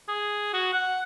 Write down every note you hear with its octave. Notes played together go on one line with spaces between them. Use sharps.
G#4
F#4
F#5